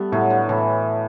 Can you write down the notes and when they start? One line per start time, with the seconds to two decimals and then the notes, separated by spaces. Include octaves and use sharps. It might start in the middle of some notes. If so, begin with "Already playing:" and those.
Already playing: G3 A3 B3
0.12 A2 F#3
0.30 D3
0.49 A2 E3